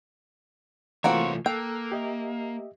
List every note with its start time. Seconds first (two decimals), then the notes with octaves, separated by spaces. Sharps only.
1.04 C2 E3 A3 A#3 C4 F4 F#4 C#5
1.46 A#3 A4 G5 E6 F#6
1.92 G4 D#5 E5